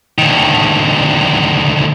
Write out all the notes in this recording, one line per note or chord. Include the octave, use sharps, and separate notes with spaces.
D2 D#3